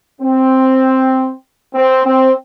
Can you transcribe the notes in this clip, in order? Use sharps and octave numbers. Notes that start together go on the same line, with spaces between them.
C4
C4
C4